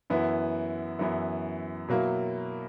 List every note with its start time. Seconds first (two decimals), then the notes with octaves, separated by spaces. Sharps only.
0.10 F#2 E3 B3 E4
0.99 F#2 E3 B3 E4
1.88 B2 F#3 A#3 E4